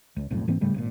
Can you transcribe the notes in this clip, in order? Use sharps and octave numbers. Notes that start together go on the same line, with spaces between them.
C#2
B1 F2 A2
G#2 E3 A#3 C4
G#2 C#3 G3 A3
G#1 A#2